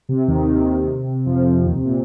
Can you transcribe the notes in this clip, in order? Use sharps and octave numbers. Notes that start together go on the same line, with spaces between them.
C3
D#2 D#3
C3
F2 F3
D#2 D#3
C3
A#2